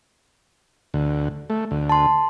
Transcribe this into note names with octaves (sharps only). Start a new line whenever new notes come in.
D2
A3
D2
A5 C6